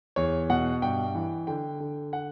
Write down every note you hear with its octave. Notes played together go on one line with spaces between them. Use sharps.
E2 C#5
B2 F#5
G2 G5
E3
D3 G5
D3
F#5